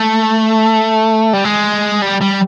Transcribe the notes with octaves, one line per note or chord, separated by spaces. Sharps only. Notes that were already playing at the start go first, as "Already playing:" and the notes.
Already playing: A3
G3
G#3
G3
G3